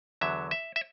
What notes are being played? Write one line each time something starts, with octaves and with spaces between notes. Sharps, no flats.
E2 D3 F#3 E5
E5
E5